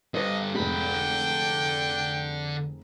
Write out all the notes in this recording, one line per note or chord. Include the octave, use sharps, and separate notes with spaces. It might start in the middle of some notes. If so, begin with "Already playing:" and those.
G2 D3 B4 C5 D#5
F1 D3 G#3 G5 B5